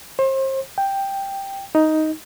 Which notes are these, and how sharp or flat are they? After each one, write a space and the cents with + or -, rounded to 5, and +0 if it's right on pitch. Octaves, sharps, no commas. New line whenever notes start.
C5 +35
G5 +5
D#4 +5